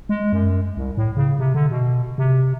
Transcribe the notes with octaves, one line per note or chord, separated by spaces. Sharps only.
G#3
F#2
C2
A2
C#3
C3
D3
B2
C3